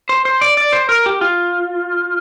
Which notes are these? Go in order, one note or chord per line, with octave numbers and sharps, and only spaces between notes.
C5
C5
D5
D5
C5
A#4
G4
F4